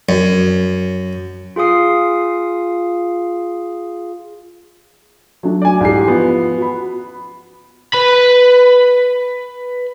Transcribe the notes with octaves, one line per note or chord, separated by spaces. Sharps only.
F#2
F4 G#4 F5 D#6 C7
F#3 A3 D4
D5 G#5
G#2 E3 D#4 G4 C7
F3 B3
F#4 B5
B4 B5